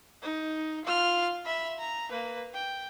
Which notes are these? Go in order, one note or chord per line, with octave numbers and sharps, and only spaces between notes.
D#4
F4 F6
E5 B5
A#5
A#3 B4
G5